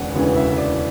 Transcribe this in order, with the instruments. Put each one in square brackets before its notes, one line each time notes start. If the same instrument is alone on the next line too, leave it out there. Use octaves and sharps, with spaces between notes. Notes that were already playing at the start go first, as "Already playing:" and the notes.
Already playing: [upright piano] E1 D2 C#3 E3 D5 F#5
E1 D2 C#3 E3
E5
D5